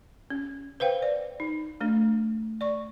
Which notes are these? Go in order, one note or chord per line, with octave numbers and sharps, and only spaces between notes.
C#4
B4 C5 F5 G5
D5
D#4
A3 D4
D5 C#6